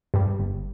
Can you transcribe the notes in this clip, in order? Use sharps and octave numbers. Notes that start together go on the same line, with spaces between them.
G2 G3
G1